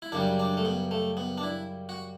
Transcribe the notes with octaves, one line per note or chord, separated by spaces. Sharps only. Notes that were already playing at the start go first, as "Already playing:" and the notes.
E4
F#2 C#3 G3 D4
D4
A3
B3
A3
B3
D4
E4
F#4